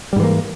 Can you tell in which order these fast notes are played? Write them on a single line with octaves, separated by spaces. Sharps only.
G3 G#2 E3 A#3